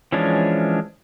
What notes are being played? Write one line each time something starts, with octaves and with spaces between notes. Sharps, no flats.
E3 F3 G#3 C#4 D4